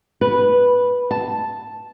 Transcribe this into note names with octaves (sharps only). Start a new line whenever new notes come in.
B4
A5